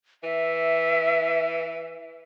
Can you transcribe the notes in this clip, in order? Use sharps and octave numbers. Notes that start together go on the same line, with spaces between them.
E3 E5